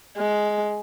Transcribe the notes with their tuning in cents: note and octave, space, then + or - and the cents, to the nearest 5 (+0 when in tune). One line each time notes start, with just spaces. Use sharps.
G#3 +10